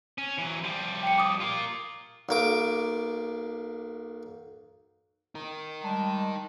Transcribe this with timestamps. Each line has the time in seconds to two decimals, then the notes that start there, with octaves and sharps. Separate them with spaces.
0.18 C#4
0.38 E3 F#3
0.63 F3 G3
1.03 G5 C#7
1.18 D6 D#6
1.40 F4 A#4
2.29 B1 A#3 D6
5.35 D#4 A#4
5.84 G3 G#3 A5